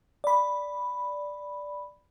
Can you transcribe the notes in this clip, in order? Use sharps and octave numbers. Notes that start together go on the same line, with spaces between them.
D5 B5